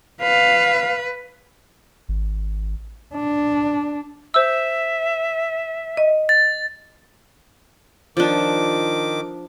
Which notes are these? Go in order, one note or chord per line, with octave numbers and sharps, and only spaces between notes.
B4 F5
G#1
D4
C5 E5 E6
D#5
A6
D#3 F3 D4 D6